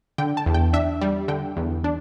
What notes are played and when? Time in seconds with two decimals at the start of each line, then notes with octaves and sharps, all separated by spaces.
0.18 D3 G5
0.37 A5
0.46 E2
0.54 G5
0.73 D4 E5
1.02 G3
1.28 D3 G5
1.57 E2
1.84 D4